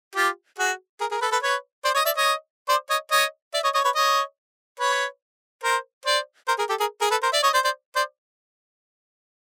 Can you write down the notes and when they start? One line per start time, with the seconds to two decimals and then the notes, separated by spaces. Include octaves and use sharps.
0.15 F4 G4
0.58 F#4 G#4
1.00 G#4 A#4
1.11 G#4 A#4
1.21 A4 B4
1.32 A4 B4
1.42 B4 C#5
1.85 C5 D5
1.95 C#5 D#5
2.05 D5 E5
2.16 C#5 D#5
2.69 C5 D5
2.90 C#5 D#5
3.11 C#5 D#5
3.54 D5 E5
3.63 C#5 D#5
3.74 C#5 D#5
3.84 B4 C#5
3.95 C#5 D#5
4.80 B4 C#5
5.64 A#4 C5
6.06 C5 D5
6.48 A#4 C5
6.58 G#4 A#4
6.69 G4 A4
6.80 G#4 A#4
7.01 G#4 A#4
7.11 A4 B4
7.22 A#4 C5
7.32 D5 E5
7.43 C#5 D#5
7.53 C5 D5
7.64 C5 D5
7.96 C5 D5